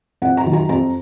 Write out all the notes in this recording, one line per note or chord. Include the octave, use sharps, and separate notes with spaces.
F2 F#5
A#5
D#3 F#3
A#5
F2 A#5